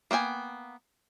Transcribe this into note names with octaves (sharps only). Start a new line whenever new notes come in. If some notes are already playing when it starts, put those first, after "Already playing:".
A#3 B3 G5 G#5